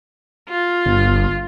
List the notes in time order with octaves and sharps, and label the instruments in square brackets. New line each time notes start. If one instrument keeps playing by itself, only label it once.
[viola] F4
[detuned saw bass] G1